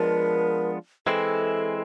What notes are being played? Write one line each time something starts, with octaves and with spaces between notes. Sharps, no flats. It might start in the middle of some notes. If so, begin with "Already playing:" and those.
Already playing: F3 G#3 B3 D4 A#4
E3 G#3 C4 E4 A4